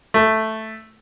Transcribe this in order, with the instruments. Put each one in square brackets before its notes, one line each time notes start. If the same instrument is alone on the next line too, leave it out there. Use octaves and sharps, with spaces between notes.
[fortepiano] A3